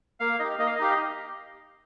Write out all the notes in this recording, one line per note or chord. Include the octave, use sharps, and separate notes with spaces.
A#3 F5
D#4 G4 D#5
A#3 D#5
F5
D#5
D#4 G4 F5
D#5